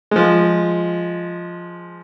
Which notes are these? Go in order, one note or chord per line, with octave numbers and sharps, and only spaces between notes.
F3 G#3